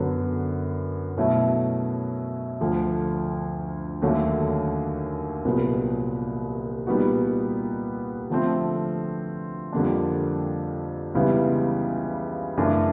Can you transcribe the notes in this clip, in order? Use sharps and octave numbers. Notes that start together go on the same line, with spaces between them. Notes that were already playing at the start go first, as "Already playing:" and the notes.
Already playing: F#2 D3 F#3 B3
B2 F#3 A3 C#4 E4
D2 D3 F3
D#2 D3 F#3 A3 C#4
C2 A#2 F#3 B3
A#2 G3 B3 D#4 F#4
D3 F3 A3 C4
F2 D3 G3 A#3 D4
C#2 C#3 E3 G3 B3
F#2 C#3 E3 A3 D4